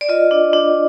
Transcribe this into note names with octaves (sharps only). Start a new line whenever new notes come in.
D5
F4 D#5
D4
D4